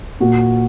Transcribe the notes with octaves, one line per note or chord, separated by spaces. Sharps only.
A#2 F#4